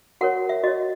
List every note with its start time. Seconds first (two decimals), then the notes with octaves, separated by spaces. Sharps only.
0.21 F#4 A#4 C#5 F#5
0.49 E5
0.63 F#4 C#5 D#5